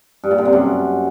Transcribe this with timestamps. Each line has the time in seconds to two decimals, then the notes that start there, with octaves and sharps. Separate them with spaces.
0.23 G2
0.31 A#2
0.38 D3
0.45 C3
0.53 F#2